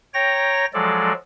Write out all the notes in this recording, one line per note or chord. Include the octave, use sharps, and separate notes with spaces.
C#5 G5 A#5 A#6
F3 F#3 G#3 A4 D5